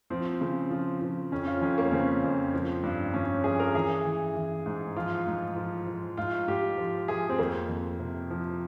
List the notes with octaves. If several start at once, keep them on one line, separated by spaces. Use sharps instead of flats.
F3 C4
C#3
F3
F3
F2 C#4
F4
F2 C#4
A#3
C#4
C#3 C4
F2
F3
G2
G2 C#4
F3 G#4
A#4
E3 G#4
E3
E3
G#2
F3 F4
G#2
F3
F3
G#2 F4
G#2 G4
F3
F3 G#4
C4
F2 A#3
F2
C3
F3